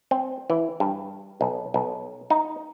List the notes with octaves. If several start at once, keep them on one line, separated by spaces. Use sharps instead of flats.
C4
E3
G2
B1
B1
D#4